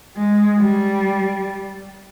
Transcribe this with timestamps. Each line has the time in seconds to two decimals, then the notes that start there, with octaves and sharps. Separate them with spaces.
0.16 G#3
0.59 G3